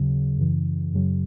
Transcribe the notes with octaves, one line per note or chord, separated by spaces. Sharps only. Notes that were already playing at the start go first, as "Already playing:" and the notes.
Already playing: D#2 C#3 F#3
F#2 C#3 E3
F#2 C#3 F#3